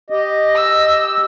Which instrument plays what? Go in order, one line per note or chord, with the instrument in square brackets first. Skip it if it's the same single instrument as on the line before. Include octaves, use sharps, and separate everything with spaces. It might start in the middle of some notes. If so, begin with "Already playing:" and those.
[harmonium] G4 D#5
[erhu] E6